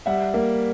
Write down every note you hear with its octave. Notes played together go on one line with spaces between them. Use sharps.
G3 E5 F#5
A#3